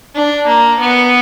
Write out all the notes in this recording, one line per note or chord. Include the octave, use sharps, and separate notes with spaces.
D4
A#3
B3